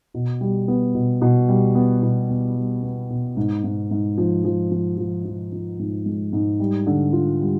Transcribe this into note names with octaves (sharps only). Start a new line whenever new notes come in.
B2
G3
B3
B2
B2
G3
B3
B2
B3
G3
B3
B2
G#2
G#2
G#2
F3
F3
F3
F3
F3
F3
G#2
G#3
G#2
G3
D3
F4
G3